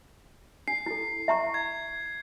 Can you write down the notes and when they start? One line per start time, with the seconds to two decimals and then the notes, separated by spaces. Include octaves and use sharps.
0.68 D4 C7
0.86 E4 A4
1.28 E5 A#5 C#6
1.54 G#6